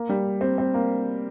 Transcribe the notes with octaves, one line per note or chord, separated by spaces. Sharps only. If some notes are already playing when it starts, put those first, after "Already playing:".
Already playing: A#3
G3
C4
C4
A#3